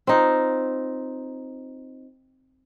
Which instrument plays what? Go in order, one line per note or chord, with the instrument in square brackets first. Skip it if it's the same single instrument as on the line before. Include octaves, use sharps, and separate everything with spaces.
[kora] C4 D#4 F4